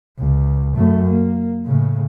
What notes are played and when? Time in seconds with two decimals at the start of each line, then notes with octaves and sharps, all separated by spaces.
0.19 C#2
0.76 F#2 A3
1.10 A#3
1.65 A2 C#3